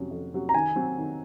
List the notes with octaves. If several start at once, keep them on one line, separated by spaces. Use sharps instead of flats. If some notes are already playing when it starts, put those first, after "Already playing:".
Already playing: F2 C3 F#3 C#4 F#4
F2
C3 F#3 C#4 F#4
A#5
D#3 G#5
F#3 C4
D#3